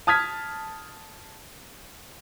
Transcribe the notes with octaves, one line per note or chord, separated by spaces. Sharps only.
A5 D#6 F6 G#6 B6